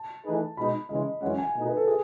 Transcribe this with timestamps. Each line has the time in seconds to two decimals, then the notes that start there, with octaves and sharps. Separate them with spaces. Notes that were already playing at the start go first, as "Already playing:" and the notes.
Already playing: A5
0.24 E3 A3 D#4 G#4 B4
0.57 B2 G#3 D#4 B5
0.89 C#3 E3 G#3 D#5
1.22 F#2 E3 G#3 C#4 F#5
1.38 G#5
1.54 B2 A3 D#4
1.65 B4
1.77 A4
1.87 G#4